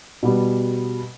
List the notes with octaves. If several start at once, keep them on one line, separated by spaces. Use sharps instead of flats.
B2 G3 B3